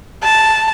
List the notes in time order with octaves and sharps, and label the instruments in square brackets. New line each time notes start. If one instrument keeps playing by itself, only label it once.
[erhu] A5